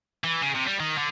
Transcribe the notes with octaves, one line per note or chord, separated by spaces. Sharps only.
E3
C#3
C3
G3
D#3
D3